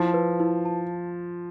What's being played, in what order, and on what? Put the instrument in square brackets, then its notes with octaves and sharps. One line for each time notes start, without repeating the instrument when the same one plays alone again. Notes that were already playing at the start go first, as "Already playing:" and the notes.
Already playing: [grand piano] F3 [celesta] E4
[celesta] B4
E4
A5